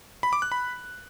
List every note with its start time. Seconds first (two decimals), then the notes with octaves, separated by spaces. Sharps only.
0.23 B5
0.33 D6
0.42 F#6
0.52 B5